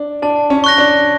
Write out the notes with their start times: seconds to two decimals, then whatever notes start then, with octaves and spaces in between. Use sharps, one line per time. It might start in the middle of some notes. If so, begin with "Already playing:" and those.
Already playing: D4
0.22 D4 A5
0.50 C#4
0.64 C#6 F#6 A#6
0.78 D4